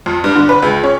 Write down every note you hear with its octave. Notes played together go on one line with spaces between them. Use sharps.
F2
G2
D3
B4
C#2
C#4